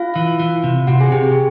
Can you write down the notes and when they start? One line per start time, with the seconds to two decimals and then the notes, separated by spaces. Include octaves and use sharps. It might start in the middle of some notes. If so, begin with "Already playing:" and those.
Already playing: F4 F5
0.16 E3
0.40 E3
0.64 C3
0.87 C3 F#4 F#5
1.01 G#4 G#5
1.12 C3 G4 G5
1.24 G#4 G#5